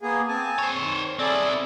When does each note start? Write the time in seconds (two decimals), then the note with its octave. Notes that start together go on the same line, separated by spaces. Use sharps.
0.01 A#3 B3 G#4
0.28 C4 G#5 A5
0.58 C5 C#5
0.78 D#3
1.19 C4 E4 G#4 A4 D5